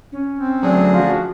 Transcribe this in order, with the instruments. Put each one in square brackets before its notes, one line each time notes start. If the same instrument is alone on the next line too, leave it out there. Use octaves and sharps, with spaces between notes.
[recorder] C#4
[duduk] C4
[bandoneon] D2 D4 G#4 [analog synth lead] F#3
[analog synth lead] F3 [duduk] F#4